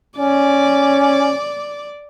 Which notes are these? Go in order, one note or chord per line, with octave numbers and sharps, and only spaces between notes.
C#4 D5